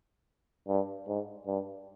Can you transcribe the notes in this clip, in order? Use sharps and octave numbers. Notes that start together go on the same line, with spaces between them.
G2
G#2
G2